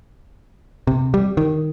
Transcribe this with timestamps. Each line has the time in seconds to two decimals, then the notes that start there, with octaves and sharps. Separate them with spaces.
0.87 C3
1.14 G3
1.37 D#3